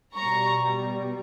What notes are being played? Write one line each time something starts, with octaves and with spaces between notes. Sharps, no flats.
B2 G3 A#5 C#6